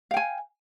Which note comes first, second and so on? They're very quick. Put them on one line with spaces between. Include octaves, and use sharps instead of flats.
F5 G5 G#5